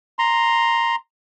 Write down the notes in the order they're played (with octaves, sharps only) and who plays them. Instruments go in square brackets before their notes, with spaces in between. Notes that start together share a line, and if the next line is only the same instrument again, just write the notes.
[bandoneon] A#5 C6